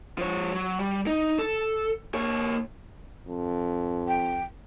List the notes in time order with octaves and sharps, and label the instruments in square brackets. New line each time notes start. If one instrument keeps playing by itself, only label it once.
[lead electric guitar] F3 C#5
F#3
G3
D#4
A4
A#3 C#5
[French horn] F2
[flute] G5